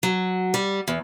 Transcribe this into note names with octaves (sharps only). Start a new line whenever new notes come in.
F#3
G3
E2